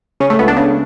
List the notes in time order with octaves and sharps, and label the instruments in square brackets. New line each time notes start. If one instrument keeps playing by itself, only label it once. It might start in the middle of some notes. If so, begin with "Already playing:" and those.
[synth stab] C#3 C#4
A3
C#2 B3
D4
C#3